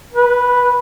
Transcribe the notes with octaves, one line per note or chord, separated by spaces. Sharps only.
B4